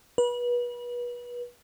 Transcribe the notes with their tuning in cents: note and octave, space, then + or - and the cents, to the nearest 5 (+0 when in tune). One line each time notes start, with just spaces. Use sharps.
B4 -30